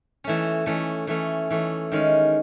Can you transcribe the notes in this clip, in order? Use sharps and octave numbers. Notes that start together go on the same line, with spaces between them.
E3 A3 C#4
E3 A3 C#4
E3 A3 C#4
E3 A3 C#4
D#3 G#3 C#4